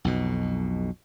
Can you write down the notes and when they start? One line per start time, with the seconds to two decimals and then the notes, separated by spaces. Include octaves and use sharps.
0.04 B1 F2 B2